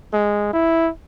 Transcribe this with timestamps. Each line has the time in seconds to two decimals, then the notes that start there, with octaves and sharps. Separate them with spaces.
0.13 G#3
0.53 E4